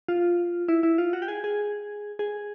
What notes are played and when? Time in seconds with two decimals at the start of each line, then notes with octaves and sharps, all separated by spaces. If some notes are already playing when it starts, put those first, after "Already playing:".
0.08 F4
0.68 E4
0.83 E4
0.98 F4
1.13 F#4
1.22 G4
1.28 G#4
1.44 G#4
2.19 G#4